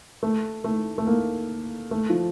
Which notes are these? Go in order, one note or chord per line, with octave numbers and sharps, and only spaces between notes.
A3
A3
A3
A#3
A3
F3